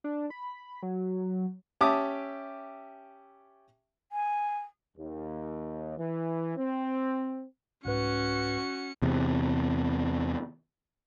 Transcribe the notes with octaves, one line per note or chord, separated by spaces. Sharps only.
D4
B5
F#3
C#4 G4 E5 A5 D6 D#6
G#5
D#2
E3
C4
C2 G#2 C#4 F#4 B4 C#7
E2 C3